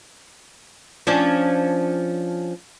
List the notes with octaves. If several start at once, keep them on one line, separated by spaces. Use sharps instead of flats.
F3 C#4 D4